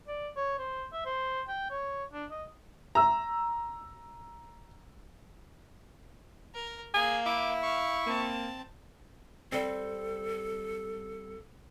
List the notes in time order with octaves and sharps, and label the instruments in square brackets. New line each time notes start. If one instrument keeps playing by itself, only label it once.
[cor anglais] D5
C#5
C5
E5
C5
G5
C#5
D4
D#5
[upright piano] A#5 E6
[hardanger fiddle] A#4
[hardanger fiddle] A#3 [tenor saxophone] G#4 [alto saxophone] G#5
[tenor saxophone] E4 [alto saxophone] E5 [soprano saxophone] D6
[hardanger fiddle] F5 [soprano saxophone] C#6
[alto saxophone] A#3 [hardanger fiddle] C4 A5
[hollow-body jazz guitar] G3 C4 [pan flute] A4